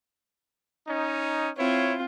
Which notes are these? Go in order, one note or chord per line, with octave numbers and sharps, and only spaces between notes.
C#4 D#4
C4 E4 F4 C#5